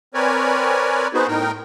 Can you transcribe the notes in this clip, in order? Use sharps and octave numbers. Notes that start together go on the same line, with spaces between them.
C4 A#4 B4 C#5 D5 G#5
B3 D#4 F#4 G#4 B4 C5
A2 D#4 A#4 G5